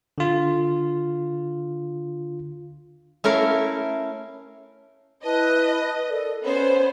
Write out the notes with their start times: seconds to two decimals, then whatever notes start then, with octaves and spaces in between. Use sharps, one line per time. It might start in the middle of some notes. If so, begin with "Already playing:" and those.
0.18 D3 F4
3.24 A3 C#4 E4 A#4 C#5 F5
5.25 E4 B4 D#5 A5
6.09 A4 A#4 D5
6.44 B3 C#4 C5 C#5